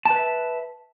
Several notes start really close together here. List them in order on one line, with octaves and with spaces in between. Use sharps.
A5 B4 E5